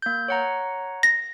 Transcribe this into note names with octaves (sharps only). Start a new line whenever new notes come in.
A#3 G6
C#5 F#5 A#5
A#6